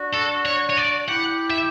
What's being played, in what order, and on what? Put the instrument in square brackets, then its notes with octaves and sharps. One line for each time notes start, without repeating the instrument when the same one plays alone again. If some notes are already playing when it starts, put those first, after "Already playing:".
Already playing: [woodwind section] D4 F#4
[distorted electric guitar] A4
C#5
C#5
D5
[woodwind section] E4 G4 [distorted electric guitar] F#5
[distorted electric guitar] E5